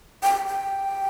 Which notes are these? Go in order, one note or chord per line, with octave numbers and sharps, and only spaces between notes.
G5
G5